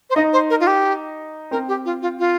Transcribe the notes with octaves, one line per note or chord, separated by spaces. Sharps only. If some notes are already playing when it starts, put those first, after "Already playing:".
C5
D#4 D#5
C5
A#4
F4
G4
C4 A#4
G4
F4
F4
F4